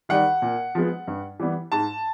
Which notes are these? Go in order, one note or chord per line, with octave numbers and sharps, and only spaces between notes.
D#3 G3 F#5
A#2
F3 G#3 B3
G2
E3 G3 B3
G#2 A5